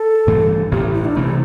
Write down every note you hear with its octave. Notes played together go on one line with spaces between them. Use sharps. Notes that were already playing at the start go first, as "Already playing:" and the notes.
Already playing: A4
A1 G2 E3 A3
A1 A2 A3 G4
E4
D4
C3 E3 A3 E4